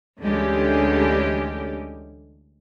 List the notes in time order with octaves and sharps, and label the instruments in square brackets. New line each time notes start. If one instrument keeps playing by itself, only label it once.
[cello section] D2 D3 E3 G#3 C#4 G4